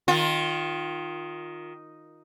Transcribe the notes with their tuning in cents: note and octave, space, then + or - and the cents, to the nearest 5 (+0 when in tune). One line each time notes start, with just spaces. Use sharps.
D#3 +0 F4 +20